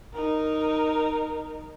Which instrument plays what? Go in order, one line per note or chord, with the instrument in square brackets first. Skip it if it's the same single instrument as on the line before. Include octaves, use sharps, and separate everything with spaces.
[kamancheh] D#4 A#4